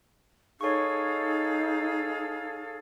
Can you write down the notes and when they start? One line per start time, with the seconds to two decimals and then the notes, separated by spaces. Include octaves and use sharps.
0.61 D#4 G#4 A4 C#5 F5 C#6